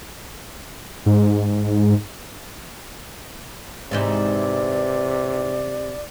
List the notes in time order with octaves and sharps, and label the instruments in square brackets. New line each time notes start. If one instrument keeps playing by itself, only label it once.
[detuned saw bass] G#2
[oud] G#2 E3 D#4 [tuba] C3 [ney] D5